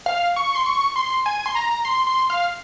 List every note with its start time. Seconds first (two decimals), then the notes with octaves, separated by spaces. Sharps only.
0.06 F5
0.36 C#6
0.55 C6
0.66 C#6
0.96 C6
1.26 G#5
1.46 C6
1.55 A#5
1.85 C6
2.07 C6
2.30 F5